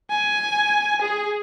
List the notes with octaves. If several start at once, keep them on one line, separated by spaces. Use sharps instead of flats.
G#5
G#4